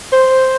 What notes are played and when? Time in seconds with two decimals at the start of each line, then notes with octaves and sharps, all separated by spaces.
0.12 C5